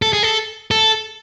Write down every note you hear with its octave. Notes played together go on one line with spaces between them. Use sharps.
A4
G#4
A4
A4